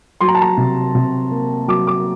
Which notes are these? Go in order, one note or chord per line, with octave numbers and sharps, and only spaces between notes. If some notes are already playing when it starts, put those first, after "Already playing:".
F#3 C6
A#5
A5
A#5
C3
C3
A#3
F#3 D6
D6